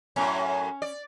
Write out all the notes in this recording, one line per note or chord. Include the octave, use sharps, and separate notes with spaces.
F#2 A2 C#4
D5